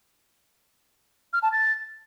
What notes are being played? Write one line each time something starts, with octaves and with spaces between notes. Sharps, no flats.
F6
A5
A6